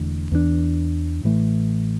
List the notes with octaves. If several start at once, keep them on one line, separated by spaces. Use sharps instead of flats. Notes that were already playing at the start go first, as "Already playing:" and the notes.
Already playing: E1 E2 D3 A3
E2 E3 G3 D4
A1 A2 E3 A3